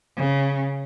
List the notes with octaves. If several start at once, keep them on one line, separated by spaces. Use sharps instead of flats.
C#3